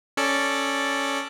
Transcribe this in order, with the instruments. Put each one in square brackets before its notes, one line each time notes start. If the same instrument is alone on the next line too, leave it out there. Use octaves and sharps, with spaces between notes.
[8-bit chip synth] C#4 A4 D5